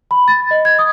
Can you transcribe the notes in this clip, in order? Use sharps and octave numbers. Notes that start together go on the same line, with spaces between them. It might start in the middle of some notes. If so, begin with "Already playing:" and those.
B5
A6
D#5
G#6
D#6